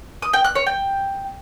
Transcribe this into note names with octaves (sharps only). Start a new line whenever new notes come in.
D#6
G5
F#6
C#5
G5